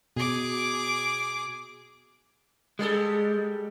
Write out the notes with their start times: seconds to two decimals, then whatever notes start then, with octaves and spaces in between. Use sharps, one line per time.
0.16 B2 G#4 D6
2.79 G3 G#3 G#4 A4